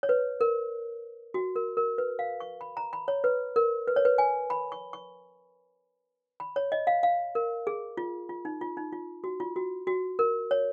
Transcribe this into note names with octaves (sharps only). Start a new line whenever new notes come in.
C#5
B4
A#4
F#4
A#4
A#4
B4
F5
C#6
B5
A#5
B5
C#5
B4
A#4
B4
C#5
B4
G#5
B5
C#6
C#6
B5
C#5
D#5
F5
F5
A#4
G#4
F4
F4
D#4
F4
D#4
F4
F#4
F4
F#4
F#4
A#4
C#5